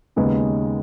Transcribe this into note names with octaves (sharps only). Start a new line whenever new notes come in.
D#2 C#3 G#3 B3 D#4